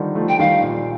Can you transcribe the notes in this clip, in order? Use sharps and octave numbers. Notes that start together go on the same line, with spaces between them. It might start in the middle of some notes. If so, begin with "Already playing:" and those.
Already playing: D3 D#3 F3 G3
F3 A3
G5
D#3 G3 F5
A#2